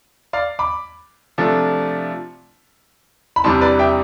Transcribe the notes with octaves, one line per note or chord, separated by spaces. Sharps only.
D5 F5
B5 D6
C3 F3 A3 D4
B5
E2 C3 G3 D4 A5 C6
B4 D5
E5 G5